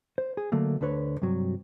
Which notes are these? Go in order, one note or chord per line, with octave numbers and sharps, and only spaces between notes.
C5
G#4
D3 F#3 A3 A#3
D2 D3 B4 C#5
G2 C3 F#3